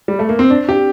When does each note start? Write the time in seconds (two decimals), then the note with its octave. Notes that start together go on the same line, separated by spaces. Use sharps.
0.08 G3
0.19 A3
0.29 A#3
0.39 C4
0.50 D4
0.69 G4